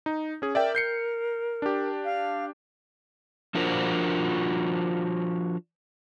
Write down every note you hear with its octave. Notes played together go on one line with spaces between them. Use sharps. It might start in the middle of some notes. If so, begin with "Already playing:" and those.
D#4
C#4 G#4
A#4 D5 E5 G5
G6 C7 C#7
D4 G4
F5
F3 D4 F4 F#4 A#4 C5